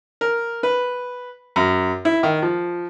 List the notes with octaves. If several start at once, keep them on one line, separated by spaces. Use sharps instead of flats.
A#4
B4
F#2
E4
D#3
F3